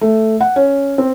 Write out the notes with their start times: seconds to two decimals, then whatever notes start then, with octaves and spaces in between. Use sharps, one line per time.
0.01 A3
0.41 F#5
0.56 C#4
0.98 C4